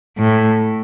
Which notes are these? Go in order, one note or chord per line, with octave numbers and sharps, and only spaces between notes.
A2